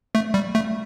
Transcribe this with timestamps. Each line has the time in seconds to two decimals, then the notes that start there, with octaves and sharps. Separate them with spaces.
0.15 A3
0.34 G3
0.55 A3